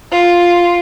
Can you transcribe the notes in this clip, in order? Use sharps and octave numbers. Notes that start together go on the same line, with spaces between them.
F4